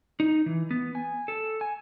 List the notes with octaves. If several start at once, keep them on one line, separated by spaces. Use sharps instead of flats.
D#4
E3
B3
G#5
A4
G#5